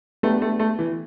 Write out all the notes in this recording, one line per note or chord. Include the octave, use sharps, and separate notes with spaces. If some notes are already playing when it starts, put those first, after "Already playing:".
A3 B3 D4 G4 B4
A3
A3
E3